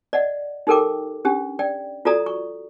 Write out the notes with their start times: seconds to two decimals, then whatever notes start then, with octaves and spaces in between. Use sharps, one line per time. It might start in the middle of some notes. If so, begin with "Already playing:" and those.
0.13 D5 D#5 F#5
0.67 D#4 G4 A4 A#4 G5 D6
1.25 C#4 D4 G4
1.59 D5 G5
2.05 F4 F#4 A4 D5 A#5 D#6
2.26 C#6